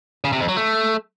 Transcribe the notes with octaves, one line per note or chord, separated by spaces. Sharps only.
C#3
C3
F2
F#3
A3